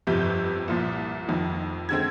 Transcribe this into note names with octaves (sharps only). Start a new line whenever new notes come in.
G1 F2 C3 G3 G6
C2 A#2 F3
F1 F2 D#3
D3 G#3 C4 G#6